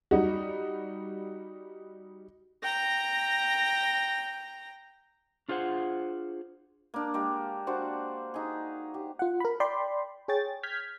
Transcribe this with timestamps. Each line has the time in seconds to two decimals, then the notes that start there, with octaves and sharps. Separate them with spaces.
0.11 G3 D#4 F#4
2.64 G5 A#5 A#6
5.49 D4 F4 G#4 C5 F#5
6.94 A#3 D4
7.14 G#3 A#3 G4
7.67 D4 F#4 C5 D5
8.34 D#4 G#4
8.94 G4
9.19 F4 F#5
9.40 A#4 B5
9.60 D5 G5 B5 C6
10.28 G#4 C#5 G5 A6
10.63 F6 G6 G#6 B6